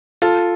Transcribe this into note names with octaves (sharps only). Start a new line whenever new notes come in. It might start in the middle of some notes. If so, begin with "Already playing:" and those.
F4 A4